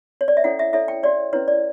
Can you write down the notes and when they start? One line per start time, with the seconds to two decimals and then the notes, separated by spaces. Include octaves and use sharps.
0.21 C#5
0.28 D5
0.37 E5
0.44 C#4 E4 A4 C#5 F#5
0.59 E5
0.73 E4 A4 C#5 E5
0.88 G5
1.03 F#4 C#5 D5
1.33 C#4 E4 B4 C#5
1.48 D5